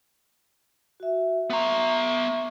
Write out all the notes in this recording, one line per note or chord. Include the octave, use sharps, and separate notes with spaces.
F#4 E5
B3 E5 A#5 C6 C#6